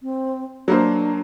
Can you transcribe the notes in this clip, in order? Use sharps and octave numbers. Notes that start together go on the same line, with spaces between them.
C4
F#3 A#3 D4 C5